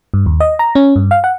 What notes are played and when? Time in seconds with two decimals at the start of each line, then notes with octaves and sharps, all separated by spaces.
0.14 G2
0.26 D#2
0.40 D#5
0.59 A#5
0.75 C#4
0.96 G2
1.11 F5
1.24 F#5